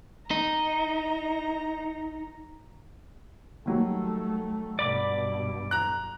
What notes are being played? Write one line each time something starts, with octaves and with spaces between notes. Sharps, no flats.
D#4 A#5
D#3 F#3 G3 A3
G2 B2 D5 B5 D6
A#5 F#6